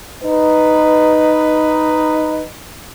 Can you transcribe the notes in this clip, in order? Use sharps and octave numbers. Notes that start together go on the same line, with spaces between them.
D#4 B4